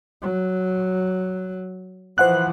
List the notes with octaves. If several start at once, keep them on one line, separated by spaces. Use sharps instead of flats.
F#3
E3 F3 C5 F#5 F#6